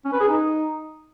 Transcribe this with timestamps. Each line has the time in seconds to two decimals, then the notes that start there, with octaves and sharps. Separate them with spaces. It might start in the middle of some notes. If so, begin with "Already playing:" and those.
0.05 C#4
0.13 B4
0.20 G#4
0.28 D#4